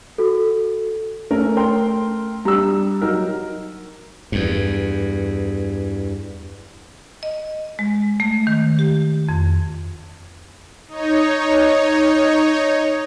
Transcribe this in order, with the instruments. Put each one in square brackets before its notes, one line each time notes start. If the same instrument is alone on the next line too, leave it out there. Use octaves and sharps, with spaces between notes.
[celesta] F#4 A4
[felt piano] A3 [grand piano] C#4 A#4
[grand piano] A#4 G5 C6
[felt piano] G3 D4 [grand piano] A#5 E6
[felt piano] F#3 D#4 A#4
[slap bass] E2 G2
[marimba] D#5
G#3
A3
D#3
G4
F2
[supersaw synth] D#4 C#5